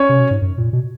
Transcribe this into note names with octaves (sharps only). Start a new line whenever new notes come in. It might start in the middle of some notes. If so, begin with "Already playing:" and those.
Already playing: C#4 C#5
C3
B2
G#2
F#2
A#2
B2